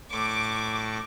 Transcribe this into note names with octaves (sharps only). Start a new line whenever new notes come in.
A2 C#6 D6